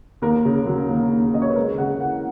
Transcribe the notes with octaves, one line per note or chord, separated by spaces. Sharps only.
D#2 A#4
C#3
F#3
D#2
D#2
C#3 D#5
C#5
B4
G#3 A#4
C#3 F#5
E3 F#5